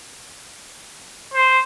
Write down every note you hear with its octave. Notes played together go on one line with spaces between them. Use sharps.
C5